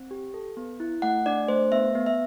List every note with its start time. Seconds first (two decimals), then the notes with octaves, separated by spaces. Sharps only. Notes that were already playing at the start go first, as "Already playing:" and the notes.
Already playing: C4
0.11 G4
0.34 A4
0.57 B3
0.80 E4
1.02 A3 F#5
1.26 D4 D5
1.48 A3 C5
1.71 B3 E5
1.95 B3
2.06 E5